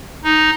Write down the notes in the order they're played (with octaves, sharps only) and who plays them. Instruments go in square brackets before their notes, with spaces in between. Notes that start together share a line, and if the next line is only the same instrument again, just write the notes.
[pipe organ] D#4